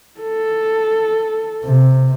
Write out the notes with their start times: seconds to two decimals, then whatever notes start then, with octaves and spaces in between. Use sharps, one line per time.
0.20 A4
1.65 C3